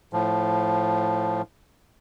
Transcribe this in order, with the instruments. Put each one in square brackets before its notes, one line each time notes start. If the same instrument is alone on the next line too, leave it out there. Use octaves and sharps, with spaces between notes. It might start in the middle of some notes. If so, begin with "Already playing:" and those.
[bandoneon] A2 F3